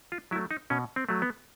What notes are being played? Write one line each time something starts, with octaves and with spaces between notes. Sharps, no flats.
F4
F#3 A3 E4
D#4
B2 C#4
C4
F#3 A3
B3